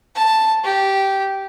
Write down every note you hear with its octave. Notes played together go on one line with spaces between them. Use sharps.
A5
G4